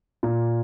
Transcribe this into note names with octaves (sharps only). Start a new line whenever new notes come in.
A#2